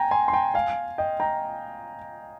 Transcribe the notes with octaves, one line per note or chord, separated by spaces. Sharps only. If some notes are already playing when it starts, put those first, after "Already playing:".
Already playing: G5 G#5 A#5
G#5 C6
C6
G5 A#5
F5 G#5
D#5 G5
G5 A#5